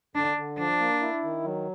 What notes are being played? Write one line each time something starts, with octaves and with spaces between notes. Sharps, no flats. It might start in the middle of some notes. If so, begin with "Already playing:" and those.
D3 D4
D3
F3 D4
A#3
E4
D#3
F#3